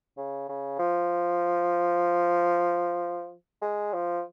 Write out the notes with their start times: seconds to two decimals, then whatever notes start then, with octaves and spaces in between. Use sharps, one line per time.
0.17 C#3
0.49 C#3
0.79 F3
3.62 G#3
3.93 F3